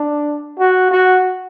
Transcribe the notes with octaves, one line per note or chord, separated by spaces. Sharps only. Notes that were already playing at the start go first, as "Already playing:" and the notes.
Already playing: D4
F#4
F#4